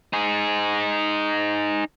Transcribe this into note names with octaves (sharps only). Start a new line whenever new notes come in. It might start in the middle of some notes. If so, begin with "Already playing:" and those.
D#4 G#4